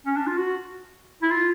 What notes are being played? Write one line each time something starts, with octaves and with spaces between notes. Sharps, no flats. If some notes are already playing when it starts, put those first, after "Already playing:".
C#4
D4
F4
F#4
E4
F4